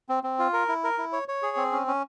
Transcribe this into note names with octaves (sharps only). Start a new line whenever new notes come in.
C4
C4
F4
A#4
E4
A#4
E4
C#5
C#5
G#4
C4
C#4
C#4